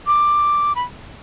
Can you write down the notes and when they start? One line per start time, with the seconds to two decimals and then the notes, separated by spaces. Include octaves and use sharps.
0.07 D6
0.75 B5